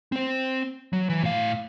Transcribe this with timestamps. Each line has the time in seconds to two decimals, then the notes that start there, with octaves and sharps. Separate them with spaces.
0.12 C4 C5
0.93 F#3
1.10 E3
1.23 A2 F5